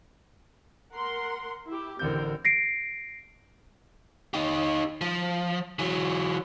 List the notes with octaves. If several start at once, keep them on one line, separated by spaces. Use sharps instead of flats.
A#4 F#5 C6
E4 G4
A1 D3 C4 A#4 G6
A#6 C7 D7
D#4 G4
F3
E3 F#3